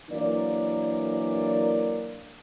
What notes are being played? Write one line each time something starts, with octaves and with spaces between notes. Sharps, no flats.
E3 F#3 A#3 D4 A#4 D5